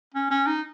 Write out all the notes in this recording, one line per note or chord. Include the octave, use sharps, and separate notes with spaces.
C#4
C#4
D#4